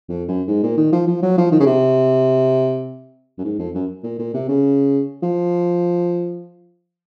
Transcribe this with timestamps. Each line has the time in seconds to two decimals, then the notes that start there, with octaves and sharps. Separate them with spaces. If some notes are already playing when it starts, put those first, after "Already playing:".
0.09 F2
0.29 F#2
0.48 G#2
0.63 A#2
0.77 D#3
0.93 F3
1.08 F3
1.23 F#3
1.38 F3
1.52 D#3
1.60 C#3
1.66 C3
3.38 F#2
3.44 G#2
3.59 F2
3.74 F#2
4.04 A#2
4.19 A#2
4.34 C3
4.49 C#3
5.23 F3